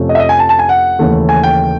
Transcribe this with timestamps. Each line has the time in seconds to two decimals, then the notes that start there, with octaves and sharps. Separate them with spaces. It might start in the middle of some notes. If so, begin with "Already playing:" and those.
Already playing: F2 C3 F3 A3 C#4
0.09 D#5
0.15 E5
0.19 D#5
0.29 G#5
0.39 A5
0.49 A5
0.59 G#5
0.69 F#5
0.99 D#2 C#3 E3 A3
1.29 G#5
1.43 G5